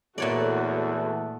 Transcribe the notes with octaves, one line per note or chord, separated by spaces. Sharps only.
E2 A#2 A3 F#4 A4 C#5 D5